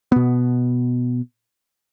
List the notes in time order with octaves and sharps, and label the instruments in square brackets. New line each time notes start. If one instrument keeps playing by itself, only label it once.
[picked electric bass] B2 B3